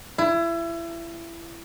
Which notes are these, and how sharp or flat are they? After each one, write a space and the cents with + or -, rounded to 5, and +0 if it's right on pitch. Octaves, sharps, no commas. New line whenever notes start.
E4 +30